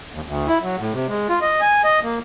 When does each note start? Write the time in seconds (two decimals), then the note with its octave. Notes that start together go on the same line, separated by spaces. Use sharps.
0.12 D#2
0.26 D2
0.48 E4
0.62 F#3
0.79 A2
0.93 C3
1.09 G#3
1.29 F4
1.41 D#5
1.61 G#5
1.84 D#5
2.03 A#3